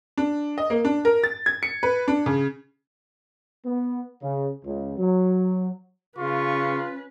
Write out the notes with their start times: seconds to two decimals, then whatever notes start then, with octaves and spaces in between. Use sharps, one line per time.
0.18 D4
0.58 D#5
0.70 A#3
0.85 D4
1.05 A#4
1.24 A6
1.46 G#6
1.63 C#7
1.83 B4
2.08 D4
2.26 C#3
3.66 B3
4.22 C#3
4.65 C#2
4.98 F#3
6.18 C#3 C#4 F4 B4 C#6